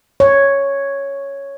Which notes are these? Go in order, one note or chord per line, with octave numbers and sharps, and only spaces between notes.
C#5